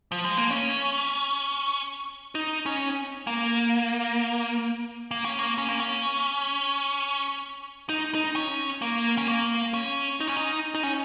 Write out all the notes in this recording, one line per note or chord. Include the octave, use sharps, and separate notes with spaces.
F3
G#3
A#3
C#4
D#4
C#4
A#3
A#3
C#4
A#3
C#4
A#3
C#4
D#4
D#4
C#4
A#3
C#4
A#3
C#4
D#4
C#4
D#4
D#4
C#4